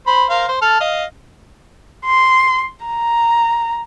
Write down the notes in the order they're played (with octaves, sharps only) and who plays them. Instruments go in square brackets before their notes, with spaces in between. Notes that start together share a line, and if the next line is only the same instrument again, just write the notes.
[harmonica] C5 B5
A#4 C5 F5
C5
A4 A5 F6
D#5 F5
[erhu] C6
A#5